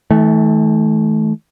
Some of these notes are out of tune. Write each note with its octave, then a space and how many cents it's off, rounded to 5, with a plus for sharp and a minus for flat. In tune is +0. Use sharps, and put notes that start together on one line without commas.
E3 -45 A3 -20